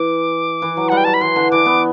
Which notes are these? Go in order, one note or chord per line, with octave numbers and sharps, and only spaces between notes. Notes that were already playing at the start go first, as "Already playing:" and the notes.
Already playing: E3 D6
E3
F#3
G3 F#5
G5
F#3 A5
B5
E3 C6
D3
E3 D6
B3